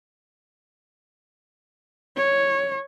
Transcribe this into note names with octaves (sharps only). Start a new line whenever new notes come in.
C#5